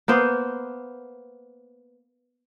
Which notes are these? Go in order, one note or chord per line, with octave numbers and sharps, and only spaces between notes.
A#3 B3 C5